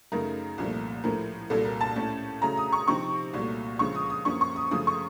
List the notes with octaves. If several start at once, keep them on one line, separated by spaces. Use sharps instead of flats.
F#2 C#3 A3 D#4 A#4
C2 A#2 F3 A3
A2 F3 A3 A#4
C2 A#2 F#3 A#3 A4
A#4
A5
A2 A3 C#4
C#3 F#3 A3 A#5
D#6
C#6
C3 F3 C4 D#4 C#6
C2 A#2 F#3 A3
C#2 C#3 F3 C#6
D#6
D#6
F#2 F3 A#3 C#4 C#6
C#6
D#6
F#2 C#3 F3 A3 D#6
C#6